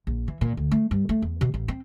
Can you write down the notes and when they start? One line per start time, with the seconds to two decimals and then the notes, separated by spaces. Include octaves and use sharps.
0.07 A#1
0.28 E3
0.41 A#2
0.57 D2
0.71 A3
0.91 G2
1.09 A3
1.22 E2
1.41 B2
1.54 A1
1.68 C4